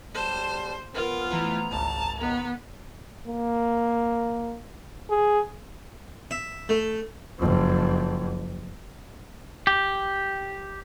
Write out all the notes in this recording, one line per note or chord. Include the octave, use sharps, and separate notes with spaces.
B1 G3 C5 A5
F3 B3 F4 A#4
E3 A3 E4 A#5
G#1 C#2 A5
D#3 B3
A#3
G#4
E5
A3
F#1 F2
G4